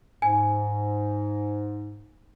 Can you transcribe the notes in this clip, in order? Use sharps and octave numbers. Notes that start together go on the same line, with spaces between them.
G#2 G#5